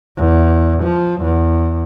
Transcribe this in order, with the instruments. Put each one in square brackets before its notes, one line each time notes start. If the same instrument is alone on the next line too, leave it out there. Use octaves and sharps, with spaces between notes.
[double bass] E2
F3
E2